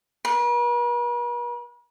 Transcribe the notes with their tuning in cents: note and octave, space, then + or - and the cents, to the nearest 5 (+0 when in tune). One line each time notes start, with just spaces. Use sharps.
B4 -45